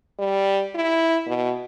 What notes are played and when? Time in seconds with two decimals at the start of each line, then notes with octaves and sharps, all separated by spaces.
0.19 G3
0.75 E4
1.27 B2